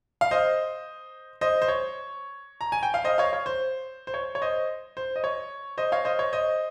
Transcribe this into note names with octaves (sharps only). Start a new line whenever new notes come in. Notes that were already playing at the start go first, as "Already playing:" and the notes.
F5
C5 D#5
C5 D#5
C5
C#5
A#5
G#5
G5
F5
C5 D#5
C#5 F5
C#5
C5
C5
C#5
C#5
C5 D#5
C5
D#5
C#5
C5 D#5
C#5 F5
C5 D#5
C#5
C5 D#5